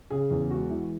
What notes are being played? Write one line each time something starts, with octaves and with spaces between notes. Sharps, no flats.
C#3 G#4
E2
G#3 F#4
E3